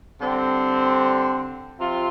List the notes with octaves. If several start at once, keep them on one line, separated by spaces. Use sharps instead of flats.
D3 G3 C4
C3 F3 C4 F4